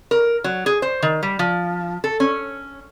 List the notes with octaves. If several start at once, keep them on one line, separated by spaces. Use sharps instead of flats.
A#4
F#3
G#4
C5
D#3
G3
F3
A4
C#4